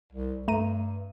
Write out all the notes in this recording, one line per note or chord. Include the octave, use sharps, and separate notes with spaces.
C2
G2 A3 A#5 D#7